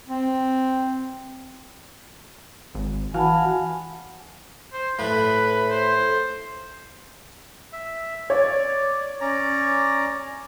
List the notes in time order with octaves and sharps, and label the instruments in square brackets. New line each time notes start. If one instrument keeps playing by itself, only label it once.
[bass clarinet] C4
[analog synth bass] G#1
[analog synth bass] E3 [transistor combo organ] F#4 F5 [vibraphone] F#5 A5 B5 [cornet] G#5
[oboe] C5
[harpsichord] A2 [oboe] B4
[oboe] C5
[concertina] E5
[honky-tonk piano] C#5 [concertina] D5
[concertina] C#4 D5 A#5